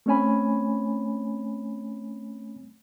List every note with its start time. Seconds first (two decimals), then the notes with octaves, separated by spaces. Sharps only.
0.06 A3 C4 C#4 C#5 G#5 B5